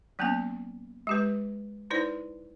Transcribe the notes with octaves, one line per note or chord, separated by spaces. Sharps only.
F#3 A#3 B3 C#4 A5
G#3 G4 B4
D#4 E4 B4 C5 D5